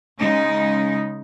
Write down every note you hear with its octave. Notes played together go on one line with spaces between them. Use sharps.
C#3 G#3 D#4